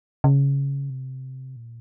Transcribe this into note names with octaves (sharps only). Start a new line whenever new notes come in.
C#3
C3
A#2